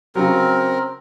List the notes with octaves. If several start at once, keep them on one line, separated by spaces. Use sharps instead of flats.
C#3 F#3 C4 A#4